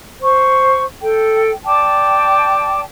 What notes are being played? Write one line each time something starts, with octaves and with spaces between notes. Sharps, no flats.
C5 C#6
A4 G5
D5 G5 A5 D6